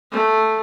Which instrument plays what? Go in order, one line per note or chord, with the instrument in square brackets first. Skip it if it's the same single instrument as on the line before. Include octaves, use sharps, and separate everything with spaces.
[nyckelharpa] A3